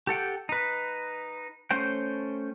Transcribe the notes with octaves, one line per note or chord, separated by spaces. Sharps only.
G4 A4 F#5 G5
D#4 B4
A3 C#4 C5 G5